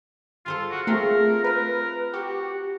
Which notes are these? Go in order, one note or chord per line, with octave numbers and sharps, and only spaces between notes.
F4 A4 C5 G#5
F#4
A3 C4 F4 G#4 A#4
A#4 B4
F#4 G4